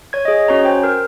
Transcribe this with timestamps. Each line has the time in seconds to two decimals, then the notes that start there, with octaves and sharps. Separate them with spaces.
0.13 C#5 G#6
0.25 G#4 D#5
0.48 C#4 F#4 C#5 A#5
0.65 C5 G5
0.84 A#4